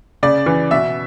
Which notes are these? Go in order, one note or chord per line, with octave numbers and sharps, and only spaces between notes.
C#3 D5
E3
B2 E5